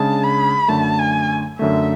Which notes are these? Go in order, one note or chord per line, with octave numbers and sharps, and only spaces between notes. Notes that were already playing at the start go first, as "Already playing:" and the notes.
Already playing: C#3 G#3 D4 G#4 A5
B5
F#2 D3 A3 A5
G#5
F#2 D3 A3 E5